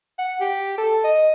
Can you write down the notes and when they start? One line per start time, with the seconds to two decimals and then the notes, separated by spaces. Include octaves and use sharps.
0.18 F#5
0.41 G4
0.78 A4
1.04 D#5